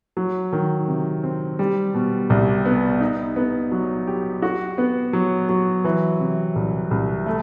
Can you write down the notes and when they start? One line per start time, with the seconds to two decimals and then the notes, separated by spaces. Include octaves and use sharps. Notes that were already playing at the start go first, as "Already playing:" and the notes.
0.17 F#3
0.53 D#3
0.88 C3
1.23 C4
1.59 G3
1.94 B2
2.30 C2
2.66 B3
3.00 D#4
3.36 B3
3.72 F#3
4.07 G4
4.42 F#4
4.78 B3
5.13 F#3
5.49 F#3
5.84 E3
6.20 C3
6.56 C2
6.91 C2
7.26 A3